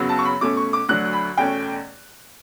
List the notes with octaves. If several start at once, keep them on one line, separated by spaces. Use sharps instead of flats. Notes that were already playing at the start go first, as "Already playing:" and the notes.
Already playing: F#2 C#3 F#3 B3
A5
C#6
B5
B2 A3 C#4 D6
C#6
D6
D2 D3 F#3 F#6
B5
E2 B2 A3 C#4 G5